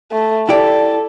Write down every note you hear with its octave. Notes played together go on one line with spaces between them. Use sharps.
A3
E4 G4 A4 D5